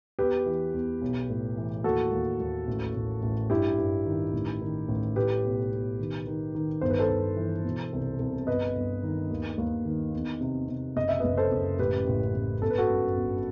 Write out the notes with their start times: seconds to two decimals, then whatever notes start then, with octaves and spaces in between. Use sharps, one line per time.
0.19 E2 G4 B4
0.46 E3
0.74 E2
1.02 B1
1.30 A2
1.57 E3
1.84 D#2 F#4 A4
2.12 D#2
2.40 D#2
2.67 A1
2.95 A1
3.22 A1
3.50 G2 E4 G4
3.78 G2
4.06 D#3
4.33 A1
4.61 D#3
4.88 A1
5.16 A2 G4 B4
5.44 B1
5.71 B1
5.99 D#3
6.26 D#3
6.55 D#3
6.81 G1 C5
6.90 B4
6.99 A4 C5
7.09 G1
7.37 E3
7.65 B2
7.93 C2
8.20 C2
8.47 G1 B4 D#5
8.75 G1
9.03 D#3
9.30 D#2
9.58 D#2
9.85 D#3
10.14 E2
10.41 C3
10.68 C3
10.96 F#1 D#5
11.09 E5
11.20 F#1 B4 D#5
11.37 A4 C5
11.51 F#1
11.79 A1 G4 B4
12.07 A1
12.34 A1
12.61 G1 A4
12.70 B4
12.78 F#4 A4
12.90 F#2
13.17 G1